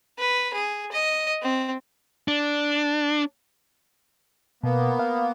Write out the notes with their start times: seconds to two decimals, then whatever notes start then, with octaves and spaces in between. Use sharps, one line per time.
0.19 B4
0.53 G#4
0.92 D#5
1.42 C4
2.28 D4
4.63 B2 A#3 B3
4.99 F5